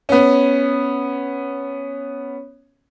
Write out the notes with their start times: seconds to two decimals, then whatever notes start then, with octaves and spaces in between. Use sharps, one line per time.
0.09 B3 C#4